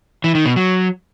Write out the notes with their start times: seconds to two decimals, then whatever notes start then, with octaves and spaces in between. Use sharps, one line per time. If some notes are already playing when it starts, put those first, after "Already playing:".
0.24 E3
0.35 D#3
0.46 B2
0.56 F#3